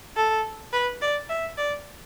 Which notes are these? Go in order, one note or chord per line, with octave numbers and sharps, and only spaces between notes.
A4
B4
D5
E5
D5